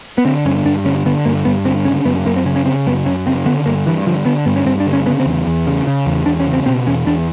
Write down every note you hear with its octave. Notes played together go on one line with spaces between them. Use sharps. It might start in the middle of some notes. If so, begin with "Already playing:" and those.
B3
D3 C4
G2 C#4
G2 D4
D3 C#4
D3 B3
G2 A#3
G2 B3
D3 C4
C#3 C#4
F#2 B3
F#2 A#3
C4
C#3 C#4
C#4
C#3 C4
F#2 B3
F#2 C#4
C#3 C4
D3 B3
G2 A#3
G2 E3
D3 F3
D3 B3
G2 B3
C#4
G2 C4
D4
D3
C#4
C#3 B3
C4
E2
E2
C#3
C#3
E2
E2 D4
C#4
C#3
C4
B2 C4
E2 C#4
E2 D4